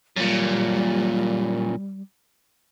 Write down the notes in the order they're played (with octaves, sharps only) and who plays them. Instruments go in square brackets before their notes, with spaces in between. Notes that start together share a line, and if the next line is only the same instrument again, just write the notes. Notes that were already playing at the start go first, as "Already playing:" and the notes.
[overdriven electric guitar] F#2 A#2 [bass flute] G3